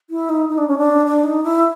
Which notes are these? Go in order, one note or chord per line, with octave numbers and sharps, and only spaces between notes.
E4
D#4
D#4
D4
C#4
D4
D4
D#4
E4